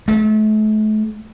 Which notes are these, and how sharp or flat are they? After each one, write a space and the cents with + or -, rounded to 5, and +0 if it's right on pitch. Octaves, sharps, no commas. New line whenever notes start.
A3 -40